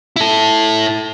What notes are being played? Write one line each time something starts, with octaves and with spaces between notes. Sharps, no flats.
E4 A4